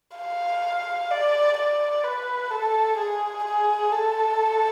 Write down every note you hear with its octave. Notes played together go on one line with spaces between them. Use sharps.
F5
D5
D5
B4
A4
G#4
G#4
A4